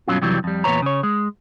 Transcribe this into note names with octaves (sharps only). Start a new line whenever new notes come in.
G2 B2 E3 F#3 C#4 F4
F2 C3 E3 F#3 G3
F2 G3
E2 A#2 C#3 B4 C#5 A#5
C#3 C#5
G#3